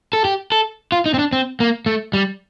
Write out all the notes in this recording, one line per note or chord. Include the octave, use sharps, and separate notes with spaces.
A4
G4
A4
F4
D#4
C4
D4
C4
A#3
A3
G3